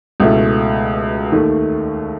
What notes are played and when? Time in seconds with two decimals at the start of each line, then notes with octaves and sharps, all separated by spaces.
0.20 C#2 B2 A3 E4
1.32 D#2 D#3 A3